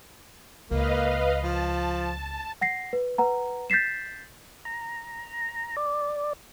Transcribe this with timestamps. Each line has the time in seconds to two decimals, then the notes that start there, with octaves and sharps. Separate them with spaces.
0.71 C#2 A#3 B4 D#5 F5
1.44 F3 A5
2.61 F#5 A#6 C7
2.93 B4
3.18 B4 F#5 A#5
3.70 G6 A6 B6 C7 E7
4.65 A#5
5.77 D5